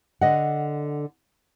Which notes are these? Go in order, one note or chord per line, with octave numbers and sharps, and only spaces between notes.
D3 D#5 F#5